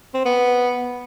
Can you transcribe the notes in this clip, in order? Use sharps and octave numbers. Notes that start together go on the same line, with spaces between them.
C4
B3